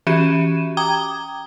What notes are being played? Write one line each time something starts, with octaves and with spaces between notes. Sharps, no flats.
E3 C#4 F#4 G4 D#7 E7
G5 A#5 D6 D#6 G#6 G7